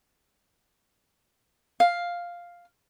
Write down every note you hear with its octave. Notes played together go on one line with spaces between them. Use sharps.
F5